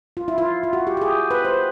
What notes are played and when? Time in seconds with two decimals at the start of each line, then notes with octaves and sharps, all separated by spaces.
0.17 F4
0.28 E4
0.38 F4
0.63 F4
0.73 F#4
0.87 G4
0.97 G4
1.02 G#4
1.31 B4
1.45 C5